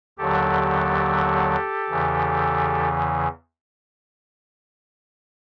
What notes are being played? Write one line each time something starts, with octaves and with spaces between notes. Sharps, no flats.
D#2 D3 F#3 G4 A4
E2 C#3 E3